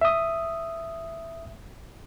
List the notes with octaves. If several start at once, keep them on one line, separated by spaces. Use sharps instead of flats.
E5 D#6